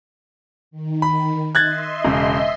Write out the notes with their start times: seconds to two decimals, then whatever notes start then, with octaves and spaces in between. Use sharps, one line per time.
0.71 D#3
1.02 B5
1.55 D#5 E5 C6 F#6 G#6 A6
2.05 E1 C#3